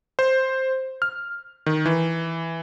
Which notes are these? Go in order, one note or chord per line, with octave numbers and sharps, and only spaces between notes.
C5
F6
D#3
E3